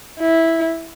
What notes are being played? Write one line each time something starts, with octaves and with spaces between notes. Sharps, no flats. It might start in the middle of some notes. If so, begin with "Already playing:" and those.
E4